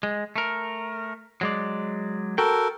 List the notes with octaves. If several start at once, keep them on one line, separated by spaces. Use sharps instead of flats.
G#3
A3 A#4
F#3 G#3 D5
F#4 A4 A#4 G5